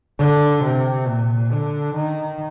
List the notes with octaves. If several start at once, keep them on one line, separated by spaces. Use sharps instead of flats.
D3
C3
A#2
D3
D#3